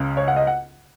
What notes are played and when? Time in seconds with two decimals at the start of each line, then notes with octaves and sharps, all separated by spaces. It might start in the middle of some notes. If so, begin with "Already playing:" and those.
Already playing: C#2 C#3
0.17 C#5
0.28 F#5
0.36 D#5
0.47 F#5